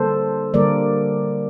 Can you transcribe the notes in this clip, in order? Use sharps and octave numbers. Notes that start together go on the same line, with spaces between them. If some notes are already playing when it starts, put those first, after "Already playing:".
Already playing: D3 G3 A#3 A4 C5
D3 G3 A#3 A#4 D5